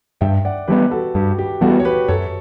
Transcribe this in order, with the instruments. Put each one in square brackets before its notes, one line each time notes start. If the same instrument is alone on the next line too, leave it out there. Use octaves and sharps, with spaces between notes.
[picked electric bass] G2 [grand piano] E5 G5
[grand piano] D5 F#5
[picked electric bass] E3 G3 B3 [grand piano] G4 B4
[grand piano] F#4 A4
[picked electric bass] G2 [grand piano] G4
[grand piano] G4
[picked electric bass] E3 G3 B3 [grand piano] F#4 A4
[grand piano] C#5
G4 B4
[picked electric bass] F#2 [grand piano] A4 C#5